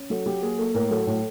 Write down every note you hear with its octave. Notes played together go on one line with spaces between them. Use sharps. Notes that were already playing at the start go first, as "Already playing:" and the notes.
Already playing: C#4
F#3 A4
F#3 G4
A#3 G#4
A#3 A4
A2 A#4
F#3 A4
A2